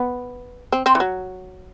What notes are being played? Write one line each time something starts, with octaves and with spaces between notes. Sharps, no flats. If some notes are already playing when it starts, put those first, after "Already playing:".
Already playing: B3
C4
C4
E3
F#3